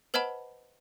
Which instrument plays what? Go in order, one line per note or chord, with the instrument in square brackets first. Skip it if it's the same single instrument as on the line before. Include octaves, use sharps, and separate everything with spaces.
[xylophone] B4 C5 D#5 F#5 A5 B5